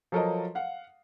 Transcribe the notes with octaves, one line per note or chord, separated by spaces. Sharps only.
F3 F#3 A4 A#4 C#5 D#5
F5 F#5